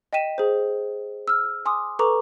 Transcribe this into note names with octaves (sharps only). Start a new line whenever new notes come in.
D#5 G5 B6 D#7 E7
G#4 C5
E6 F6
G#5 C6 D6 D#6
A4 B4 A#5 C#6 D6